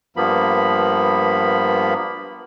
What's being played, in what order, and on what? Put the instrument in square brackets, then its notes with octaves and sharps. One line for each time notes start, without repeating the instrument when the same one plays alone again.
[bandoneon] G2 F3 A#3 B3 B5